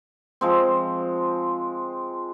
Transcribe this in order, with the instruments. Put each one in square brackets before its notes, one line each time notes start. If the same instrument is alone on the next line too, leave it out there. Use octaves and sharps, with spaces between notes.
[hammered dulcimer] F3 G#3 C4